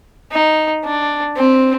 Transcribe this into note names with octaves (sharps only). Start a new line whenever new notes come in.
D#4
D4
C4